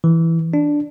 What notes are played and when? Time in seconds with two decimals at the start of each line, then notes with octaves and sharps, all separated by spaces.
0.04 E3
0.54 D4